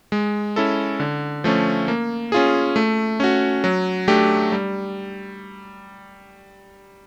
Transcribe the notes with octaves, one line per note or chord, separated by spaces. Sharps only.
G#3
C#4 E4 A4
D3
F3 A3 C#4
A#3
C#4 F4 G#4
A3
C#4 F#4
F#3
A3 D4 G4
G3